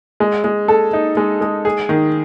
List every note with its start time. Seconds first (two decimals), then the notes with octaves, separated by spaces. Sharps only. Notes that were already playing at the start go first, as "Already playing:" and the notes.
0.20 G#3
0.44 G#3
0.68 A4
0.93 D#4
1.17 G#3
1.41 G#3
1.65 G#4
1.89 D#3